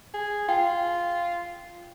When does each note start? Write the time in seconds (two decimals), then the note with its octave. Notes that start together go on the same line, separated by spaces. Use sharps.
0.14 G#4
0.49 F4 G5